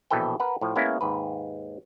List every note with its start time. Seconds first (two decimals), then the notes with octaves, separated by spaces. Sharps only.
0.10 A#1 B2 E3 A4 B4 G5
0.40 A#4 B4 F#5
0.61 A2 F3
0.75 G#3 A#3 B3 C#4 E4
1.01 D#2 G#2 B4